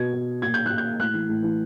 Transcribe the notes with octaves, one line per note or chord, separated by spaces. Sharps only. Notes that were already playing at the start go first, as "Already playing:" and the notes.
Already playing: B2 G#6
B2
A#2 G#6
G6
F#6
A#2
G6
A2 F#6
E3
A2
E3